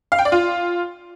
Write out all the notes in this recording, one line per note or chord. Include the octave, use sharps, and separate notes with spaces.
F5
G5
D5
F4